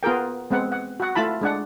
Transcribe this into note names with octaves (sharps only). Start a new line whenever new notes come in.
B3 F4 G#4 A#4 G5
G#3 B3 C4 F#5
F#5
F#4 F#5
A3 E4 F4 A5 B5
G#3 D4 F#5